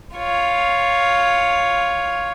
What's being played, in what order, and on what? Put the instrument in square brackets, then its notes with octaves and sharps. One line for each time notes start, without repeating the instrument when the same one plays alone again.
[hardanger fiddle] F4 C#5